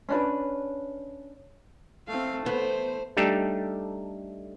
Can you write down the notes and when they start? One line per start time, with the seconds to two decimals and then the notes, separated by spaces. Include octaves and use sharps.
0.09 C#4 D4 B4
2.08 A3 C4 F5
2.46 A3 B3 C5
3.17 G3 A3 D4 D#4 G4 A4